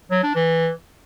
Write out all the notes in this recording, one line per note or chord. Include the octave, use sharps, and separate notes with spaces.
F#3
D4
E3